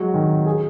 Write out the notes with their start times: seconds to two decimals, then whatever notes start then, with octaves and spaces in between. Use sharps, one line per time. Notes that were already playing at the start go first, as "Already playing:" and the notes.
Already playing: F#3 G#3
0.14 D#3
0.46 G#4